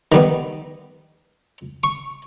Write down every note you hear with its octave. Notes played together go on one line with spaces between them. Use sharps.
D#3 G3 B3
C#6